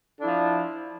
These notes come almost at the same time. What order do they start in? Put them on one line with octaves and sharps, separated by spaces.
D4 E4 F3